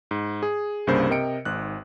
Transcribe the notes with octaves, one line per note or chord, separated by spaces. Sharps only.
G#2
G#4
C2 G2 C#3 A#3 C5
C3 A#4 D#5 G5 C#7 D7
G#1 G#2 F#6